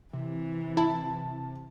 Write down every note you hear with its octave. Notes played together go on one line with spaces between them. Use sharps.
C3 E3
E4 A5